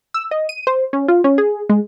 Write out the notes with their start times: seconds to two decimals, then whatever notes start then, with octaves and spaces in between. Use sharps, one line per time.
0.14 E6
0.31 D#5
0.49 D#7
0.67 C5
0.93 C#4
1.08 F4
1.24 C#4
1.38 G#4
1.69 G#3